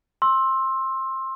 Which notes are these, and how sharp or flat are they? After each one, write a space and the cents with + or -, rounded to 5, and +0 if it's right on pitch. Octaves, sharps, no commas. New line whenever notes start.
C6 +20 E6 -5